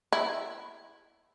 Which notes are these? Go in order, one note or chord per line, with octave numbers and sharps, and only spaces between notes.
E4